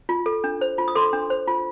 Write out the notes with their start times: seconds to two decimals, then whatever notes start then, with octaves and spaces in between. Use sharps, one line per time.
0.09 F4
0.26 A4
0.44 D4
0.61 C5
0.78 F4
0.88 D#6
0.95 A4 C6 D6
1.13 D4
1.30 C5
1.48 F4